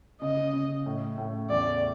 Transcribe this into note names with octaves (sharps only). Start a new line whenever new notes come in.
C#3 D#5
C#3
A2
A2
E2 D5